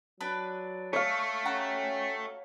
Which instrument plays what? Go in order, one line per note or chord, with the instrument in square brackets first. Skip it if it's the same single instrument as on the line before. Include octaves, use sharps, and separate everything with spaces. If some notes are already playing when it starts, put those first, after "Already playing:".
[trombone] F#3 [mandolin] D4 B4
[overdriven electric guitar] A3 [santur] C#5 F5
[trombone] C#4 [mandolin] F#4 G4 A#5